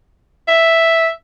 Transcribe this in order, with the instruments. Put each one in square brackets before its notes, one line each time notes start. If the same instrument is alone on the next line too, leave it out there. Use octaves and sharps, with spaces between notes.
[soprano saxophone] E5